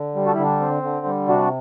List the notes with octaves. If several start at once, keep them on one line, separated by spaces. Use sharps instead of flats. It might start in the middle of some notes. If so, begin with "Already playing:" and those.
Already playing: D3
G3
F#4 A4
D3 E4
D4
C4
D3
G3
C3 D4 F#4